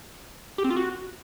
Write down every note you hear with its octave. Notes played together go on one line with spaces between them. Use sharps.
G4
C4
F4
F#4